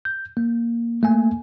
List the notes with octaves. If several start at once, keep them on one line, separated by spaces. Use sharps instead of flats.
G6
A#3
A3 A#3 G#5